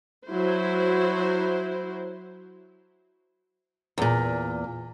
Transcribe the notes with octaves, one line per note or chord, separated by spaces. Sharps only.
F#3 E4 C5
E2 A#2